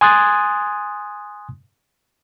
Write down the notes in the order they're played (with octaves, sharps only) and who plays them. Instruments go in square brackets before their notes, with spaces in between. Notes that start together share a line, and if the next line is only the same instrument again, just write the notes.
[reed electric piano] G#5 C6 D#6 F#6 G#6 A6